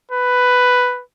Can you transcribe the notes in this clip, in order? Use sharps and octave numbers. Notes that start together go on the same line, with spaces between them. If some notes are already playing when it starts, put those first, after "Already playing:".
B4